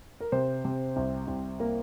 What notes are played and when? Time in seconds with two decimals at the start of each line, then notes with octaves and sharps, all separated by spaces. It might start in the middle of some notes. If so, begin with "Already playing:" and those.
0.20 A#4
0.32 C3 C5
0.65 C3
0.96 C2
1.27 C2
1.60 A#3 A#4